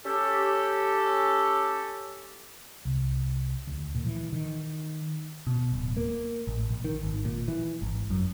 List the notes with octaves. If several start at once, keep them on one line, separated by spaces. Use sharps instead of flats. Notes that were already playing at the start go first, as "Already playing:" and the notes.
C#4 G4 A4
C2
D2
A#2
E3
D#3
B2
D1
A#3
A1
A#1
D#3
G#1
A#2
E3
G#1
F#2